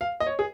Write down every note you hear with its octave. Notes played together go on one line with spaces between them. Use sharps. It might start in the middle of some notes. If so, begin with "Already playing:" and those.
F5
D#5
C#5
G#4